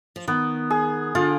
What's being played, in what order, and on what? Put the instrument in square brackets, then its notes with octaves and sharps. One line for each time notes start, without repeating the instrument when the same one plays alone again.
[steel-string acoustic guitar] F3
[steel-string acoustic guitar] D#3 [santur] B3
[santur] G#4
[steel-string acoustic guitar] D3 [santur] F4